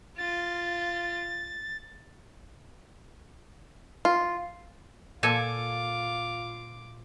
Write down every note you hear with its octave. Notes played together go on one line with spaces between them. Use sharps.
F4 A6
F4
A#2 F4 A4 G#5 D6